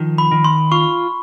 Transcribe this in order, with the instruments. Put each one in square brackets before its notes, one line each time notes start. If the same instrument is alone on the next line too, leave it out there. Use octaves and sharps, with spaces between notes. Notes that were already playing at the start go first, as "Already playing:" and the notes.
Already playing: [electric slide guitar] D#3 F3
[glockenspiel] B5
[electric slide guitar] D#3
[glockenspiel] C6
[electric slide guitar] F4 [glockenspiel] C#6